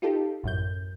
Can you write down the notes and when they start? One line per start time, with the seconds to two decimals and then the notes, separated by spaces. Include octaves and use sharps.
0.02 D#4 F4 G4 A4
0.43 A1 F#2 G6